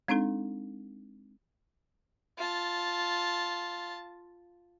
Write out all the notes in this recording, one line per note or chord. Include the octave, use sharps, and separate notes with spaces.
G#3 C4 D4 D#4 A4
F4 A5